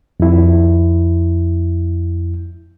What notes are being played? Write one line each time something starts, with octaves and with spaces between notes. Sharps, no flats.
F2 E4